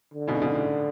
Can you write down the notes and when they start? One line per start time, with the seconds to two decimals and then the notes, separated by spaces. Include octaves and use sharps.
0.14 D3
0.28 G#2 B2
0.35 C#3
0.42 G#2 B2
0.55 A2 C#3